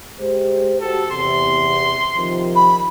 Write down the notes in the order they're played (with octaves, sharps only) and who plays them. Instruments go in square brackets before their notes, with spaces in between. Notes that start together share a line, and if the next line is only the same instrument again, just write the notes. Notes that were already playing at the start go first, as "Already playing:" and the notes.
[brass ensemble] G#3 G4 C5
[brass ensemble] F#4 G4 [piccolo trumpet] A4
[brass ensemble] E2 C3 [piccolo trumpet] C6
[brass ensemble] C3 D#3 F3
[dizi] B5